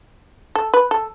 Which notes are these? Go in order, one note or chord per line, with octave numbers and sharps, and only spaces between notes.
A4
B4
A4